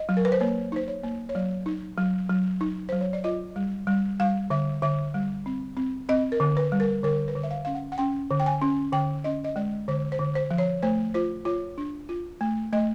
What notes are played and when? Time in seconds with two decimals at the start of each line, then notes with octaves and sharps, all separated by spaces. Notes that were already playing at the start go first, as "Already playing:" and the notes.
Already playing: D#5
0.09 F#3
0.17 A#4
0.25 B4
0.32 C5
0.40 A#3 C#5
0.72 D#4 C5
0.88 C#5
1.03 A#3
1.29 C#5
1.35 F#3 D5
1.66 D#4
1.98 F#3
2.29 F#3
2.61 D#4
2.89 F#3 C5
3.01 C#5
3.13 D5
3.24 F4 D#5
3.56 G3
3.87 G3
4.20 G3 F5
4.50 D3 E5
4.82 D3 E5
5.14 G3
5.46 C4
5.77 C4
6.09 C4 D#5
6.32 A#4
6.40 D3
6.57 B4
6.72 G3
6.80 A#4
7.03 D3 A#4
7.28 B4
7.35 D3
7.43 E5
7.51 F5
7.65 C#4 F5
7.75 F#5
7.92 F#5
7.98 C#4 G5
8.31 D3
8.40 G5
8.46 G#5
8.62 C#4
8.93 D3 G5
9.24 C#4 D#5
9.44 D#5
9.56 G#3 D5
9.88 D3 C5
10.12 C5
10.19 D3
10.35 C5
10.51 F3
10.58 C#5
10.83 A3 C5
11.14 F4 C5
11.45 F4 C#5
11.78 D4
12.09 F4
12.41 A3
12.73 A3 D#5